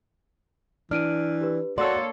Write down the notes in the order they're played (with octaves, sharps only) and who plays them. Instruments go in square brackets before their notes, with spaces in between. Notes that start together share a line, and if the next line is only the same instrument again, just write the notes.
[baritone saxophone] E3 [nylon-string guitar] D4 [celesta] F6 D7 D#7
[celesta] G4 B4
[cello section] A#3 A4 C#5 [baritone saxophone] F#4 [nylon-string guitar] D5 [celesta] C6 E6